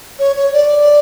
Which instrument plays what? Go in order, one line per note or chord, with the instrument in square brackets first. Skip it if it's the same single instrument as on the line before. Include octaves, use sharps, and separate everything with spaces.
[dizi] C#5
C#5
D5